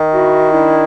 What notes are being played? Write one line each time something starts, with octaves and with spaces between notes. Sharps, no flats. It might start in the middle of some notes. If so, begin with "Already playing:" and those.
Already playing: D#3
E4 F#4
D4 E4